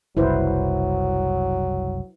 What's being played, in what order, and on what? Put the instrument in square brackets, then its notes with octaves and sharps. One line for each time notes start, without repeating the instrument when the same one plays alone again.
[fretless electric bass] F#1 C2 [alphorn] F#3 [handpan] E4 B4 C5